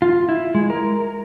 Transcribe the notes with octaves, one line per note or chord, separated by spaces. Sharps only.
F4
E4
G#3
A#4